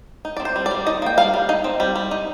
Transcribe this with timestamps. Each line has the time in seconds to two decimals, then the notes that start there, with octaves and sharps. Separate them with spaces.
0.25 D#4
0.37 C4 D5
0.45 C5
0.56 G3
0.66 D5
0.71 G3
0.87 D#4 D#5
1.02 A#3 G5
1.18 G3 F5
1.34 G3
1.49 D#4
1.64 C4
1.80 G3
1.96 G3
2.11 D#4